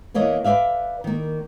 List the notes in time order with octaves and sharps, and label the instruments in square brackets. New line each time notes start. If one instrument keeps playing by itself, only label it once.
[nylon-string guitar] E2 E3 A#3 C#5 D#5
B4 C5 D5 E5 F5
D#3 A#3